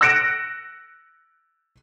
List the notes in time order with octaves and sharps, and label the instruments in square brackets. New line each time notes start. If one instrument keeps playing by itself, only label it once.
[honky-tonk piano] E6 F#6 A#6 C#7 D7 E7